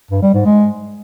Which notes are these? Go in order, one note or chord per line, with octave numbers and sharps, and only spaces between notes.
G2
G3
G#2
G#3